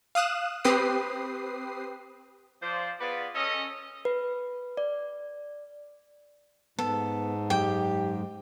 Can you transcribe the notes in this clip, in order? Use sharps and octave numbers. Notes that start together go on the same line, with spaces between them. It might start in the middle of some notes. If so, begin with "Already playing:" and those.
F5 D#6 F#6 E7
C4 G4 B4 D#6 C7
F3 C5 D5
B3 F4 G#4 B4 D5
C#4 A4 D#5
B4
D5
G#2 B3 A4
F#2 G#3 G4 G5